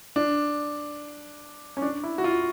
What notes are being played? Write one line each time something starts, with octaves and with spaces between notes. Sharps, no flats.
D4
C#4
D4
E4
F#4
F4